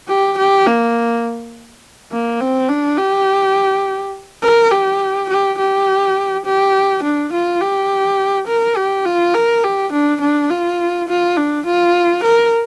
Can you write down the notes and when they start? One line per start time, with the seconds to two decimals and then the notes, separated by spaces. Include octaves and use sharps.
0.09 G4
0.38 G4
0.67 A#3
2.12 A#3
2.40 C4
2.69 D4
2.98 G4
4.43 A#4
4.72 G4
5.30 G4
5.59 G4
6.46 G4
7.04 D4
7.33 F4
7.61 G4
8.47 A#4
8.77 G4
9.06 F4
9.35 A#4
9.64 G4
9.93 D4
10.21 D4
10.50 F4
11.08 F4
11.37 D4
11.66 F4
12.24 A#4